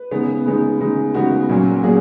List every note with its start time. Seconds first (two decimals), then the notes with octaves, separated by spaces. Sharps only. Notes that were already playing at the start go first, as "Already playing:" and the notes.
Already playing: B4
0.11 C#3 G#3 B3 D#4
0.46 C#3 G#3 B3 D#4
0.80 C#3 G#3 B3 D#4
1.14 C#3 G#3 B3 D#4 F#4
1.49 A#2 F#3 A#3 C#4
1.83 A#2 F#3 A#3 C#4 G#4